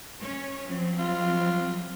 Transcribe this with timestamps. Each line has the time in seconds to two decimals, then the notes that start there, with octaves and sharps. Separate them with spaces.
0.20 C#4 C#5
0.66 F3 F#3 C4
0.99 F4